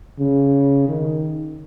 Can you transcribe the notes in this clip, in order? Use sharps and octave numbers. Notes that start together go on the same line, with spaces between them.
C#3
D#3